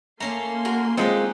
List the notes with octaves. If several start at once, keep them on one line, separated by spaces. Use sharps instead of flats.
A3 A#3 C#4 F5 A#5 C6
F#4 A#4
G#3 C4 C#4 D#4 F4 G4 F#5